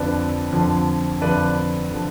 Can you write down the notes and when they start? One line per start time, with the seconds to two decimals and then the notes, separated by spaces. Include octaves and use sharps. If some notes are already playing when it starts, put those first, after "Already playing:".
Already playing: F2 D3 F3 B4 D5
0.51 F2 D3 F3
1.21 F2 D3 F3 B4 D5
1.91 D3 F3